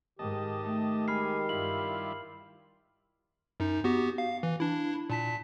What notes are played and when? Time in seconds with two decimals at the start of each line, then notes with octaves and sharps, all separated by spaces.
0.19 G#2 D#3 G4 D#5 A5
0.62 A3
1.08 G#3 G#5 B5 F6 C7
1.49 G2 G3 E4 F4 F#7
3.60 F#2 D#4
3.84 B3 F#4 G4
4.18 F5
4.43 E3
4.60 D4 E4
5.10 A#2 A5 B6